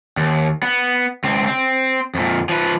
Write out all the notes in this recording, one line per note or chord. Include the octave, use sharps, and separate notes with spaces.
D#2
B3
C#2 C4
C4
F2 A#2
F3 B4